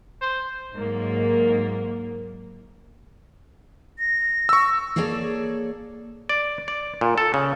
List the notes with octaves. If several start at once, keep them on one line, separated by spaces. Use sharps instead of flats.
C5
G#2 F#3 A#3
A#6
C#6 E6
A#3 G#4 A4 C#5 D5 A5
D5
D5
A#2
A4
C#3